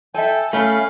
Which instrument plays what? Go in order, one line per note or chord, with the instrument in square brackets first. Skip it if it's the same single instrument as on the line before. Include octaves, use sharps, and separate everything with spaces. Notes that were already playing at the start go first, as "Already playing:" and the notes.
[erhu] A4 [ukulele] E5 G#5 [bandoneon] G5
[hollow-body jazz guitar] A3 [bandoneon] C#4 F5 [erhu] B5